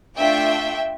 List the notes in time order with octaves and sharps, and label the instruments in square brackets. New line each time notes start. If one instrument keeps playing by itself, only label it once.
[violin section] A3 D4 F4 E5 G5